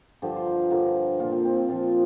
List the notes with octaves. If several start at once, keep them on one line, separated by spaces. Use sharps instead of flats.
G2 D3 F3 G4
C5
A#4
G2 D3 F3 A#4
A#2 F3 F4
C4
C4
C4
A#2 F3 F4